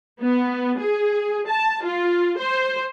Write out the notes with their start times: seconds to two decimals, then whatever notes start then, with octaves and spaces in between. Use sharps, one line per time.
0.21 B3
0.78 G#4
1.48 A5
1.83 F4
2.38 C5